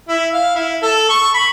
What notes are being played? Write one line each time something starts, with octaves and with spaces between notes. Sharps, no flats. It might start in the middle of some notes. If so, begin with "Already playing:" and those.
E4
F5
E4
A4
C#6
B5